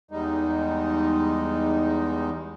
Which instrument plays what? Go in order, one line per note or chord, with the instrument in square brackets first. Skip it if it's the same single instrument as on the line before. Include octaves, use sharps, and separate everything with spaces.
[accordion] E2 G3 G#3 D#4